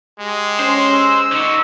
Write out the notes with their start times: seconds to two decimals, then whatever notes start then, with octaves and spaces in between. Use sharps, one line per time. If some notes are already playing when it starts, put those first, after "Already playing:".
0.20 G#3 G4
0.59 C#4 C5
0.94 E6
1.32 D3 D#4 F#4